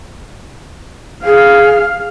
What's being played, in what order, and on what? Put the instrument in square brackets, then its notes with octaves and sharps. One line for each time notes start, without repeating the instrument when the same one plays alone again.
[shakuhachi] G#4 [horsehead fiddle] F5